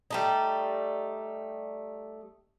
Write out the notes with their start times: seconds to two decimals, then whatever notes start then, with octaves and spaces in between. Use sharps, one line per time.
0.11 G3 A3 D#4